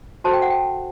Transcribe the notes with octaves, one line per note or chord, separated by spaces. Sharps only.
F#4 A4 C5 A5
G5
F#5
G5